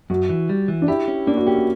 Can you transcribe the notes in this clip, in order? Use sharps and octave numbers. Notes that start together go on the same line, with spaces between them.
F#2 F#4
E3
G3
E3
D4
E4 G4
C#4
A#3 D4
F#4
C#4 G4
F#4